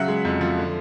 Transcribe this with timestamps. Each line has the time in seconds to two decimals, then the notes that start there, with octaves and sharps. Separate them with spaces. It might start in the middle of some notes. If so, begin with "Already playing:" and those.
Already playing: C#3 F#3 E5 F#5
0.08 G#3
0.25 F2
0.41 F3
0.58 D3